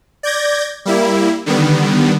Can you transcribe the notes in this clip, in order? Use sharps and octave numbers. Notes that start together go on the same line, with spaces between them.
D5 G6 G#6 A#6
G3 A#3 E4
D3 D#3 G3 B3